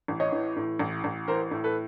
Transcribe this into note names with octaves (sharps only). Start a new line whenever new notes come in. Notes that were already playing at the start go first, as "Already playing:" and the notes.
A1
C#5 D#5
E3
A2
A1
A1
E3 A#4 C5
A2
A4 B4